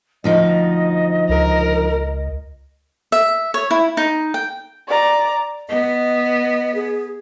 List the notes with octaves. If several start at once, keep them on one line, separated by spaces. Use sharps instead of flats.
D2 F3 D#4 D#5
C#2 A#4
E5
C#5
E4
D#4
G5
D5 A#5
B3 D#5
G#4